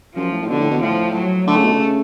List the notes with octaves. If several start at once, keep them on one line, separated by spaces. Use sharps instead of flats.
F#2 F3
A2
A2
B2 D3
A2
B2
A2 F3
F#3
D3 A3
C#3
B2
C#3